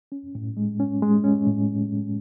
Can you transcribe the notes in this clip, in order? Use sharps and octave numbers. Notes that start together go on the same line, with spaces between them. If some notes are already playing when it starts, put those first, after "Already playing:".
C#4
A2
G#3
C#4
G#3
C#4
A2